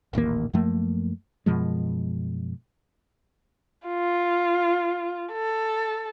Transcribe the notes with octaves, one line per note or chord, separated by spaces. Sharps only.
D#1 A1 D#2 A#3
F#2 F3 A3 A#3
F#2 B2 F3 G#3
F4
A4